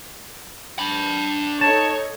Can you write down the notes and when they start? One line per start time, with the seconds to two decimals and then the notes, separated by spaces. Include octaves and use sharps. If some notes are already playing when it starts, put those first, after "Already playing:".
0.79 D4 B5
1.61 D#4 A4 C#5 A5